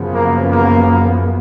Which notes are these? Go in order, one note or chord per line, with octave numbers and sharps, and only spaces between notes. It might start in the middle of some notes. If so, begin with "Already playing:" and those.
Already playing: F#2 C#3 F3 B3
A#3
A#3